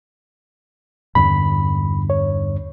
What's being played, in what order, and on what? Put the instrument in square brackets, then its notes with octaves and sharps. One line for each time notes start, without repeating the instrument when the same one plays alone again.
[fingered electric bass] E2 G2 D3 [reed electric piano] B5
[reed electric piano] C#5